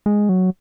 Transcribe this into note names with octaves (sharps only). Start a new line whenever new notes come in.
G#3
F#3